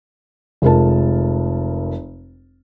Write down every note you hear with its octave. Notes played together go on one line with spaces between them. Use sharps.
F1 G#3 F4 A#4 A5